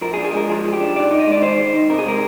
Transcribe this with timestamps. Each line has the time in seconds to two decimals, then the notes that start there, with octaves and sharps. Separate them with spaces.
0.01 F3 A#4
0.14 G#4
0.17 D4
0.25 G#4
0.33 G#3 A#4
0.49 F3 G#4
0.64 F3
0.73 G4
0.81 D4
0.96 D#3 D5
1.11 D#4
1.20 D#5
1.27 G#3 D5
1.42 D#3 C5
1.58 D#3
1.73 D#4
1.90 C3 A#4
1.99 G#4
2.05 G#3 A#4